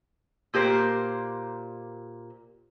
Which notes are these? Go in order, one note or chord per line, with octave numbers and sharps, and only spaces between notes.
A#2 G4 A#4 C5